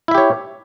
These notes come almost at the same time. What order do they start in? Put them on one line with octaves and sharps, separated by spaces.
E4 E5 G4 C#5